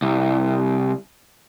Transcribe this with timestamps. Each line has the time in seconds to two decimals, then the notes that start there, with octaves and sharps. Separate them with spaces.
0.02 C2